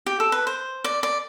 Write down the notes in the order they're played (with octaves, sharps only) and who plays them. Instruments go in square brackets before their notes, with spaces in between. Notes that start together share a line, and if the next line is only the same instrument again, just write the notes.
[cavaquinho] G4
A4
B4
C5
D5
D5